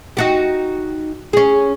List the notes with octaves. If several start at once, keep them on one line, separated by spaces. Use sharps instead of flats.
D#4 F#4 G4
C#4 G#4